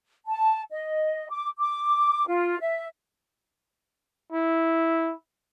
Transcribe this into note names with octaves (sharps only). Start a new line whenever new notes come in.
A5
D#5
D6
D6
F4
E5
E4